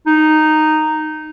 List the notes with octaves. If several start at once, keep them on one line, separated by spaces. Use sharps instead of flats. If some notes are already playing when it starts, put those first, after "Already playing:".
D#4